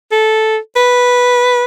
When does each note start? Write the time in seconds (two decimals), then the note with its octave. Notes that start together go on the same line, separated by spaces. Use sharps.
0.12 A4
0.76 B4